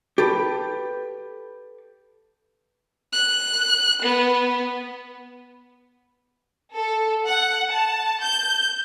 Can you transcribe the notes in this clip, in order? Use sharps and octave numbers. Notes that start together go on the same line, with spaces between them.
G4 A4 B4
F#6
B3
A4
F#5
A5
G6